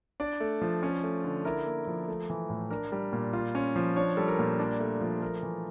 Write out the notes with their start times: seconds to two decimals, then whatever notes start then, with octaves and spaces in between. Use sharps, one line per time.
0.20 D4 D5
0.40 A3
0.62 F3
0.83 C#4
1.03 A3
1.24 D3
1.45 E4 A#4
1.66 A#3
1.87 F3
2.08 A3
2.30 E3
2.49 A2
2.70 D4 A#4
2.92 G3
3.13 A#2
3.33 F4
3.55 C#4
3.76 F3
3.96 D4 C#5
4.17 G3 A4
4.28 A#4
4.39 A#2
4.59 D4
4.80 A3
5.01 F3
5.22 A3 A#4
5.43 E3